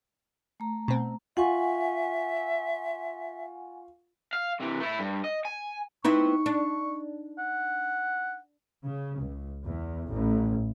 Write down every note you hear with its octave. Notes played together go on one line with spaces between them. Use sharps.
A3 A#5
B2 C4
F4 E5 F#5 G#5 C#6
F5
C3 E3
A3 E4
G2
D#5
G#5
B3 C4 D#4 E4 C#6
D4
F#5
C#3
C#2
E2
A1